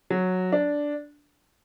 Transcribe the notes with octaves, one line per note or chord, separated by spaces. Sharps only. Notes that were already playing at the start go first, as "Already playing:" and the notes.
F#3
D4